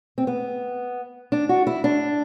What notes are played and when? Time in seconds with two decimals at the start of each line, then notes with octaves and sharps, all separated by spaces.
0.18 C4
0.27 B3
1.32 D4
1.49 F#4
1.67 E4
1.84 D4